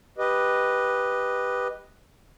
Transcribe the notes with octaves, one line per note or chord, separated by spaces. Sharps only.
G4 B4 D#5